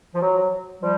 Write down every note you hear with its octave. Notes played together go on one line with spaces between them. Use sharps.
F3
F#3
F3 G3